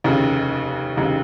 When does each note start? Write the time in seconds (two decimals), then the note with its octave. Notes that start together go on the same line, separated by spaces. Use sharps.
0.04 F1 D#2 C#3
0.96 F1 D#2 C#3